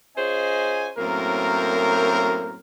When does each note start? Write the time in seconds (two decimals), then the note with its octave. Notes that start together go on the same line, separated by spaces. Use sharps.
0.17 C#4 F4 G#4 C5 D#5 G#5
0.98 F#2 A2 A#3 C4 A#4